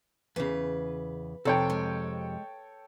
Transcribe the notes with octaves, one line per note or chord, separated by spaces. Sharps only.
E2 C#3 B4
F2 C3 A4 C#5 G5
G#3